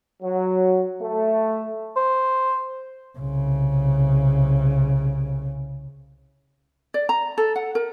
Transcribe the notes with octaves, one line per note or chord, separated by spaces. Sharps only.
F#3
A3
C5
C2 C#3
D5
A#5
A4
F#5
A#4